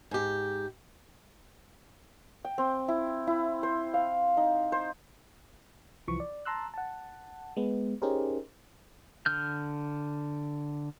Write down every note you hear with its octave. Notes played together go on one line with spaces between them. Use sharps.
G#2 G4
G5
C4
E4
E4
C5
F5
D#4
C5
C2 E3 F3 C#6
D5
A5 A#5 C6 E6 F#6
F#5 A5
G#3 B3
C#4 D#4 G4 G#4 A#4 C5
D3 F6 G6